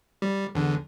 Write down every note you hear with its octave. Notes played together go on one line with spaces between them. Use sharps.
G3
E2 D3